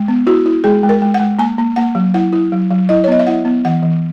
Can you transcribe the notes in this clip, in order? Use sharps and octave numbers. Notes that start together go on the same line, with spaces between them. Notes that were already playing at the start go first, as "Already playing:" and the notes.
Already playing: G#3
B3
E4 F#4
E4
G#3 G#4
G#3
A#4
G#3
F#5
G#3
A#3 G#5
A#3
A#3 F#5
F#3
E4 F#5
E4
F#3
F#3
E4 D#5
C#5
B3 D#5
E5
E4 F#5
B3
E3 F#5
E3